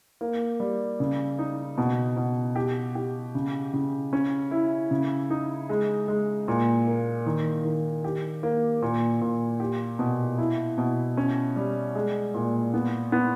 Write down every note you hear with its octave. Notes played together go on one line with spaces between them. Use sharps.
A#3
G3
C#3
D#4
B2
B2
G4
G4
C#3
C#3
C#4
E4
C#3
D#4
G#3
G#3
A#2
A#3
D#3
D#3
G4
A#3
A#2
A#2
G4
B2
E4
B2
C#4
G3
G#3
A#2
B3
B3